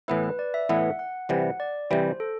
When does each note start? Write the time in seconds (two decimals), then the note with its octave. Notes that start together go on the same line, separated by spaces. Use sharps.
0.08 A2 E3 B3 E4 B4
0.23 B4
0.39 D5
0.54 E5
0.69 A2 E3 B3 E4 F#5
0.99 F#5
1.29 C3 E3 G3 F#5
1.60 D5
1.90 C3 E3 G3 C5
2.20 A4